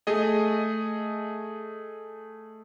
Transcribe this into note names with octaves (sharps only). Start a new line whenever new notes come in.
A3 G#4 D#5